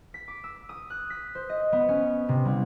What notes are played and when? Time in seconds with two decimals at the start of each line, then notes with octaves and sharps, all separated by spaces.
0.14 B6
0.28 D6
0.44 E6
0.69 D#6
0.90 F#6
1.10 B6
1.35 C5
1.49 D#5
1.72 B3
1.88 C#4
2.29 C3
2.45 C2